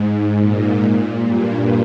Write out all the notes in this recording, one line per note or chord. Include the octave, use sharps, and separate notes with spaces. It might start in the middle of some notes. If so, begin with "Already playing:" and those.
Already playing: G#2
A#2
G2